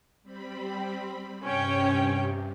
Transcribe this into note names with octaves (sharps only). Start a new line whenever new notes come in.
G3 C4 B5
G2 C3 C#4 C#5 G5